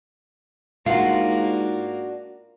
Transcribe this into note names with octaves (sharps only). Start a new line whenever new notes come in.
G#2 A#3 D4 F4 F#4